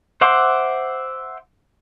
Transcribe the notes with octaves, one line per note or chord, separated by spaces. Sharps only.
C5 E5 F#5 C6 D6